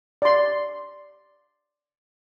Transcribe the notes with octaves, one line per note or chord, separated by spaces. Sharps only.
D5 C6